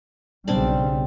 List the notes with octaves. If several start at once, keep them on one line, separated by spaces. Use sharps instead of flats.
B1 C#3 G3 C4 D4 D5